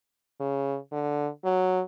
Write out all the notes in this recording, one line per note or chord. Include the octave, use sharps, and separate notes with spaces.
C#3
D3
F#3